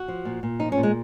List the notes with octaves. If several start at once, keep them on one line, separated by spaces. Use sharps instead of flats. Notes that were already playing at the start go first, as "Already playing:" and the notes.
Already playing: F#4
F3
A#2
A#2
F3 D#4
C#4
A#2
G#3